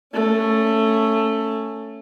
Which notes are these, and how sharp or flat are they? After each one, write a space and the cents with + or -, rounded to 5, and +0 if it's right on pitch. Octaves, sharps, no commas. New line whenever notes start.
A3 +10 C#4 +0